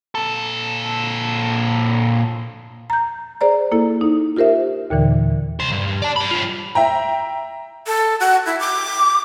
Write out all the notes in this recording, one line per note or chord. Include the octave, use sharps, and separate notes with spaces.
A#2 A4
A#5 G6
G#4 C5 D5 A#5
A#3 E4 A4
D#4
F4 G4 A#4 C5 E5
D#2 A#2 D3 E3
C2 C5
G2
G2
D5 A5
D4 B5
G3 F4
E5 G5 A#5
A4
F#4
E4
D6